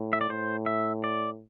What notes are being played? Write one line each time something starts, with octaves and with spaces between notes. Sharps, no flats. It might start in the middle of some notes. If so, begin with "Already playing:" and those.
Already playing: A2
E5
D5
A2 C5
E5
D5